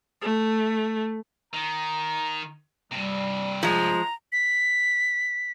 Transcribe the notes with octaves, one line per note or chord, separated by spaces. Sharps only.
A3
D#3 A#5
G2 C3 G3
F3 G#3 A#5
B6